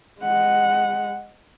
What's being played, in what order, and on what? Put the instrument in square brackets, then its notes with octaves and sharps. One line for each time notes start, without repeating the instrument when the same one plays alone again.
[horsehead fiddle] G#3 F#5